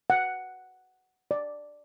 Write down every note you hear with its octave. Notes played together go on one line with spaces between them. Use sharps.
F#5
D5